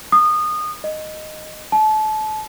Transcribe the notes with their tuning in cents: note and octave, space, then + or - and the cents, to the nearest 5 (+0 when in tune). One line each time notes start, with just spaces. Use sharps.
D#6 -25
D#5 -5
A5 -30